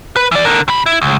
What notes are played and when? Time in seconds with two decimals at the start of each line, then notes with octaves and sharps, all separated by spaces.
0.16 B4
0.31 E3 D5
0.45 D3 A#4
0.68 C3 B5
0.86 E4
1.02 C#2